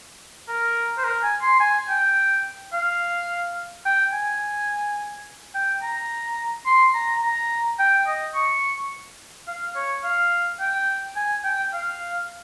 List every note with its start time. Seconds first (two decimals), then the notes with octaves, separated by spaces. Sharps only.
0.48 A#4
0.98 C5
1.04 A#4
1.23 G#5
1.42 C6
1.60 G#5
1.89 G5
2.73 F5
3.86 G5
4.13 G#5
5.54 G5
5.83 A#5
6.66 C6
6.95 A#5
7.22 A#5
7.79 G5
8.07 D#5
8.35 C#6
9.47 F5
9.75 C#5
10.04 F5
10.60 G5
11.16 G#5
11.44 G5
11.73 F5